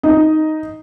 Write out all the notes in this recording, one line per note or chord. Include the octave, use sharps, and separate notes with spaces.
D#4 D#5